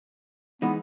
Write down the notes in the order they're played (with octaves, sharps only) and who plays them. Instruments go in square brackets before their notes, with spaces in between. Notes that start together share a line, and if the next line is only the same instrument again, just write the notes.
[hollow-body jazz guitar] E3 G#3 D#4 [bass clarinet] B3